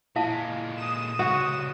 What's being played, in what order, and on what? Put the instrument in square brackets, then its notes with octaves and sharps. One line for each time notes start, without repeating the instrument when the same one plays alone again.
[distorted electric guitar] A#2 G#3 [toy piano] E4 F5 A5
[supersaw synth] D#6 E7
[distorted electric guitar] C#2 C3 [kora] F#4